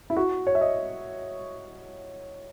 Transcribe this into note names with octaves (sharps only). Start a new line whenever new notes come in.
E4
F#4
C#5
E5
D#5